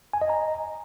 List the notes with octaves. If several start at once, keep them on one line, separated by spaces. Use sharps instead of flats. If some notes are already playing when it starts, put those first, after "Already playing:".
G#5
D#5
A#5